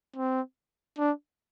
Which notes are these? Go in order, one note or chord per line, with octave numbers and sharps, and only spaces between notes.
C4
D4